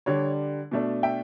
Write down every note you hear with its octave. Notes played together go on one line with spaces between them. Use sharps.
D3 G3 D4 C#5
B2 A3 D4
E5 G5